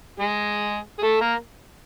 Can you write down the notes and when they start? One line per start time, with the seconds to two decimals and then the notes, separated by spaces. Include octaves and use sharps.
0.20 G#3 G#4
0.99 G#4
1.03 A3 A4
1.21 A#3 A#4